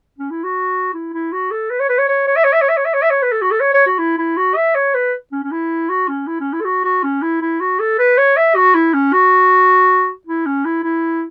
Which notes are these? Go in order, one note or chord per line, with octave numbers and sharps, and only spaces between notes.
C#4
E4
F#4
E4
E4
F#4
A4
B4
C#5
B4
C#5
C#5
C#5
E5
C#5
E5
C#5
E5
C#5
E5
C#5
E5
C#5
B4
A4
F#4
A4
C#5
C#5
F#4
E4
E4
F#4
E5
C#5
B4
C#4
C#4
E4
F#4
C#4
E4
C#4
E4
A4
F#4
F#4
C#4
E4
E4
F#4
A4
B4
C#5
E5
F#4
E4
C#4
F#4
E4
C#4
E4
E4